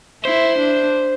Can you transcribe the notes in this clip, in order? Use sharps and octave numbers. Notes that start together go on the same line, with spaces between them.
E4 C5
D4